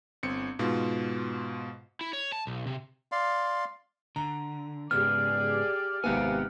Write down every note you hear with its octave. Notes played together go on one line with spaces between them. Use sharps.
G1 C4 C#7
G#2 B2 F4
E4
C#5
A5
B1
C3
D5 F5 C6
D3 A#5
G#2 C#3 B3 G4 G#4 D5 F6
G#1 C3 B3 G4 F5 F#5 G#5